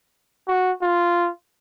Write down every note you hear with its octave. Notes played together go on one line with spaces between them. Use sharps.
F#4
F4